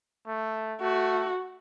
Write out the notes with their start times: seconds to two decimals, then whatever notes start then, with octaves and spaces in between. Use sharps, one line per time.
0.27 A3
0.81 A3 F#4